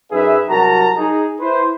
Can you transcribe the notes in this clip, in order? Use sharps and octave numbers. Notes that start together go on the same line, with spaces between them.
F#2 D#4 G#4 B4 E5
C2 F#3 F#4 A#4 A5 A#5
D#4 G#4
E4 B4 C5